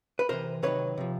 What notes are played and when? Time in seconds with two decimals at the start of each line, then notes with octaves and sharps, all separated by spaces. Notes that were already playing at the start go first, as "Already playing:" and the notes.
0.19 B4
0.29 C3 E3 A#4 C5
0.63 C3 D#3 F#3 B4 C#5
0.98 C3 F3